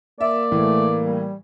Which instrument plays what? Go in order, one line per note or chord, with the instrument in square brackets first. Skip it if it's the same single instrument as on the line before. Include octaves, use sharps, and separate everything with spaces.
[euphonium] A#3 [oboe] D5 [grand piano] E5
[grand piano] A2 E3 [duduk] A3
[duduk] G3